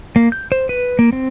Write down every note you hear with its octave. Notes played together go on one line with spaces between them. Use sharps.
A#3
G6
C5
B4
A#3
C4